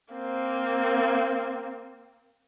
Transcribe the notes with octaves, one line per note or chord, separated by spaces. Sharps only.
A#3 C4